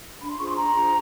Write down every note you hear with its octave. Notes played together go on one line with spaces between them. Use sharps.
D4 B5
C6
F4 G#4 C5 C#6
C6
D4 A#5
F4 G#4 C5